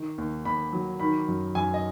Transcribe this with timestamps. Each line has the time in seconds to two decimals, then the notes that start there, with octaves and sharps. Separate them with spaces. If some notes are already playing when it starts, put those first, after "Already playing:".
Already playing: D#3
0.18 D#2
0.45 D#2 B5
0.73 F#3
1.00 D#3 B5
1.28 F#2
1.55 F#2 G#5
1.74 D#5